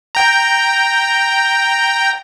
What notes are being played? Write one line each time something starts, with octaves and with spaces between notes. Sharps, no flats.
G5 A#5